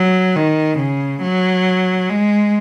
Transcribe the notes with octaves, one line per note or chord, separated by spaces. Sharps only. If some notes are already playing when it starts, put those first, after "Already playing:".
Already playing: F#3
D#3
C#3
F#3
G#3